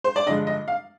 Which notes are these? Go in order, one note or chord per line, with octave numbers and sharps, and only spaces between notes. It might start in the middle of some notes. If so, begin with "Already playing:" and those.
C5
D5
G2 D3 F3 G#3 D#5
D#5
F5